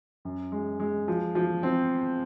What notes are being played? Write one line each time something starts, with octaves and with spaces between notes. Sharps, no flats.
F#2
G#3
G#3
F3
F3
C4